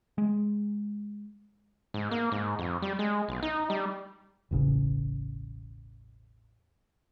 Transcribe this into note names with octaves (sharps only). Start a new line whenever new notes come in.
G#3
G#2
A#3
G#2
F2
G3
G#3
B1
D#4
G3
E1 A1 C#3